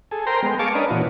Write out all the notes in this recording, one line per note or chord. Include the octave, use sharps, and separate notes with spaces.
G#4 A4
A#4 C5 G5 A#5 C6
G#3 B3
G#4 F5 A5 C#6 D6
C#4 D4 A#4 B4 D#5
A#2 E3 F#4